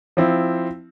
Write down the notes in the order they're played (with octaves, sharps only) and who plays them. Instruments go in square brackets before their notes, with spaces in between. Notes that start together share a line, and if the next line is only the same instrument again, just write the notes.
[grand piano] F3 C4 E4